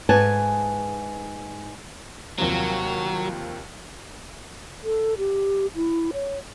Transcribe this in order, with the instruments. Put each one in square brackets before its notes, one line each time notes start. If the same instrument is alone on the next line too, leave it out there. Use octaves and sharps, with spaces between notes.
[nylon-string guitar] G#2 B4 G#5 A5
[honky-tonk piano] D#2 C3 F3 [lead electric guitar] F#3
[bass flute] A4
G4
E4
C#5